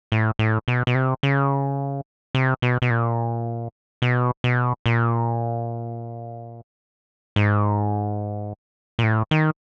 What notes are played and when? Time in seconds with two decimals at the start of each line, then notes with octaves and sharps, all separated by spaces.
0.12 A2
0.39 A2
0.68 B2
0.87 B2
0.95 C3
1.23 C#3
2.35 C3
2.62 B2
2.82 B2
2.90 A#2
4.02 B2
4.44 B2
4.86 A#2
7.36 G#2
8.99 A#2
9.04 A2
9.31 D#3